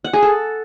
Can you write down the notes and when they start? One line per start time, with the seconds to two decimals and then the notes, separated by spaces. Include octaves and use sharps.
0.04 F#5
0.13 G#4
0.22 A4